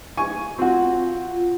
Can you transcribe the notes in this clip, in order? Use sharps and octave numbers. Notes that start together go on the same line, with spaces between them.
G#5 C#6
C4 F4 F#4